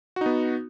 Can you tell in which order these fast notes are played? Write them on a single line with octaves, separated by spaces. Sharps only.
F#4 D#4 B3